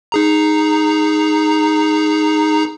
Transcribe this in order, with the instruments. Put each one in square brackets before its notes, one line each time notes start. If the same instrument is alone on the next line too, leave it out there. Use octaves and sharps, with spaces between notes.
[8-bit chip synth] D#4 G#4 A#5